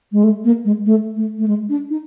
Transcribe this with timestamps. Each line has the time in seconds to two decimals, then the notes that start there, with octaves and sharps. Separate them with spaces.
0.12 G#3
0.24 A3
0.45 A#3
0.65 G#3
0.86 A3
1.17 A3
1.38 A3
1.48 G#3
1.69 D4
1.90 D#4